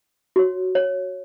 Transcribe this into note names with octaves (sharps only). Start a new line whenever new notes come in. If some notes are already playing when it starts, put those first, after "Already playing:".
F#4 C#5
C#5